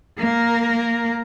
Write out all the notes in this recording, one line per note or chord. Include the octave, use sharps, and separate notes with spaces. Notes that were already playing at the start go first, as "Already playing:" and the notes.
A#3 A#4